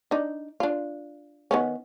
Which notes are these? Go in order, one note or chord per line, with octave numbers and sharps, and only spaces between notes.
D4 D#4
D4 F4
D#3 B3 C#4